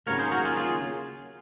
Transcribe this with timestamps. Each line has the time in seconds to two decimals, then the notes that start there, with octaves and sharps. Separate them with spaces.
0.06 D#2 C#3 F#3 A#3 A#4 C#5
0.19 G#4 C5
0.31 F#4 A#4
0.45 F4 G#4
0.57 F4 G#4